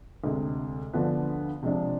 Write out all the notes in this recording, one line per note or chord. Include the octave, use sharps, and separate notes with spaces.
D2 C3 G#3
D2 D3 F3 B3 F4
C3 F3 G#3 D4